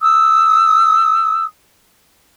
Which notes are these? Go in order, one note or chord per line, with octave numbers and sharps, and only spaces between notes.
D#6 E6